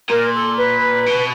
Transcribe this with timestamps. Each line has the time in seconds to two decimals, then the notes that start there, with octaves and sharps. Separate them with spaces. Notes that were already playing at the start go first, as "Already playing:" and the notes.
0.09 A#2 A#4
0.34 A4
0.58 B4
1.06 B2